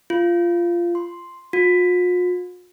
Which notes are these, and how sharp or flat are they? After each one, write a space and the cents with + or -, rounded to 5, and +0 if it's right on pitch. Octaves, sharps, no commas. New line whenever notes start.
F4 -15
C6 +0
F4 +45